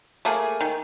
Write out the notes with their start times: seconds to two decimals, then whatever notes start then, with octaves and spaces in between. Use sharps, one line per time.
0.25 A3 A#3 G#4
0.61 D#3